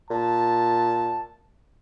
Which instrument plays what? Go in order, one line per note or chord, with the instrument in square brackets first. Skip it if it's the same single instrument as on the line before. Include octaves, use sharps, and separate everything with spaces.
[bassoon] A#2 [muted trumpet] A5